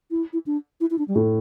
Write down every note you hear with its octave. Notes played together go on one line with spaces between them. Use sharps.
E4
E4
D4
E4
E4
D4
G3
A2 A3